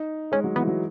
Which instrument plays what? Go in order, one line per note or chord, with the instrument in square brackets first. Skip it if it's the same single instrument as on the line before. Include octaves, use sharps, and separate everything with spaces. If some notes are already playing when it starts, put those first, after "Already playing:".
Already playing: [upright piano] D#4
[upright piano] G#3 [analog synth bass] C#4
[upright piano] F#3
[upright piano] E3 [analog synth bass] B3
[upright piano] F#3